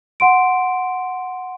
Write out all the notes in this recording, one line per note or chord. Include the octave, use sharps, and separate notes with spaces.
F#5 C6 D7